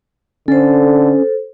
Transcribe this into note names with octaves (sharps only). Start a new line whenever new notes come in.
D3 C#4 A4 C5